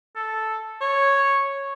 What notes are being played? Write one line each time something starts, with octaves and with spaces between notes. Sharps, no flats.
A4
C#5